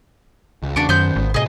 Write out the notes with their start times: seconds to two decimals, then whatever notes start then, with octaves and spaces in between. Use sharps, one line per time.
0.63 C#2
0.76 E2 C#3 D4 F#4 D6
0.89 F#2 D#3 B3 C#4 C5 G6
1.16 G#1
1.34 A2 C3 G#4 D#5